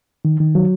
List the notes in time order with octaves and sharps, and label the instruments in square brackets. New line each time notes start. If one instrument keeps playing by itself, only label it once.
[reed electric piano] D#3
D#3
F#3